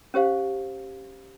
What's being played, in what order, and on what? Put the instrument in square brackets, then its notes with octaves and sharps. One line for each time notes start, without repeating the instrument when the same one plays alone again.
[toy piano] C#4 G4 C5 F5